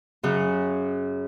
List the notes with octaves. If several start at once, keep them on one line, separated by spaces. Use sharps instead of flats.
F#2 C#3 F#6